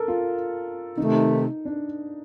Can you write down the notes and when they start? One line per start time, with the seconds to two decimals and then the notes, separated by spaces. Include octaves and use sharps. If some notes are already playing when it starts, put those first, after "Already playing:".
Already playing: A4 A#4
0.08 F4
0.97 C3 D#3 A3 D#4
1.65 D4